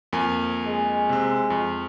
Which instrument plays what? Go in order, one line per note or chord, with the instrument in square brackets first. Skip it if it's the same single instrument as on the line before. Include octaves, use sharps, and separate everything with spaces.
[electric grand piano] F2 A#3 G#5
[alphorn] G#3
[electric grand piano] C3 C4
F2